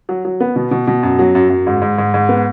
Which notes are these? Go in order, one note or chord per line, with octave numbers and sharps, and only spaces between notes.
F#3
F#3
B3
B2
B2
B2
F#2
F#3
F#2
F#2
G#2
G#2
G#2
G#2
B3